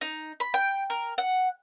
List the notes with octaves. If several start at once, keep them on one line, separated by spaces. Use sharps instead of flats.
D#4
B5
G5
A#4
F#5